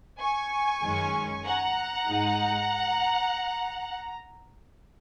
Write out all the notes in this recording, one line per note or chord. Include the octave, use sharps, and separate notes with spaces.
G#5 C#6
F#2 D#3 G#3 C#4
F#5 A#5
G#2 G#3 D#4